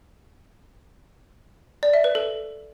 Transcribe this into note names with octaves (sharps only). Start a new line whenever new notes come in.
D5
E5
B4
A4